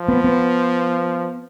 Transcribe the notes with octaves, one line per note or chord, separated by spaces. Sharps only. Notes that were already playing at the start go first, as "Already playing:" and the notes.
Already playing: F3
B3
B3